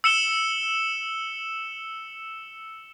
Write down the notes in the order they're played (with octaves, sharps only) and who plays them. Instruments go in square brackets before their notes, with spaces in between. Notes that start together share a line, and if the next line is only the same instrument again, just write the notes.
[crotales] E6 C#7 E7 G7